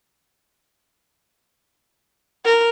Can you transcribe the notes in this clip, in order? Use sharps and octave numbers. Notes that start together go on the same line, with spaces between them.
A#4